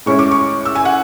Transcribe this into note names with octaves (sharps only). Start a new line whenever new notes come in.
A2 G#3 C#4 E4 C#6
D6
C#6
E6
G#5
F#5